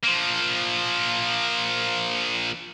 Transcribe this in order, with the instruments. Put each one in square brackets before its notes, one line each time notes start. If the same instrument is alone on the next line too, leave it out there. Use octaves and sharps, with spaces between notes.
[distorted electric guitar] F3 A#3